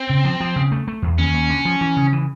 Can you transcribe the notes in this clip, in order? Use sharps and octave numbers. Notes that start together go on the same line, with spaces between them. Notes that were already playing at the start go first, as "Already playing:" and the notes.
Already playing: C4
C#3
F3
F3
C#3
A3
A3
E2
D#2 C#4
D#2
D3
F3
E3
C#3
E3